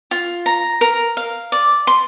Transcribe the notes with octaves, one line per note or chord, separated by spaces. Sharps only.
F4
A#5
A#4
F5
D5
C6